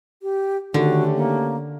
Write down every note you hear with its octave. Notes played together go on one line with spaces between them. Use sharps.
G4
D3 D#3 A3 C#4 F#4 G4
A#3